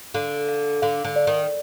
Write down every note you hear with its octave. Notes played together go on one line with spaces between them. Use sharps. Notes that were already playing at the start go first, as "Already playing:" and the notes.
D3 F5
F5
D3 F5
D3
D5
D#3